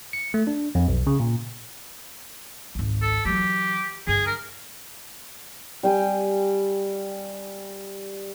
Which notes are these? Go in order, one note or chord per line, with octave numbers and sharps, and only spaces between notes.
C#7
A3
D4
F2
B1
C#3
A#2
G#1 C#2
A4
E3 F#3 G4
G2 D3 G#4
A#4
G3 G5 G#5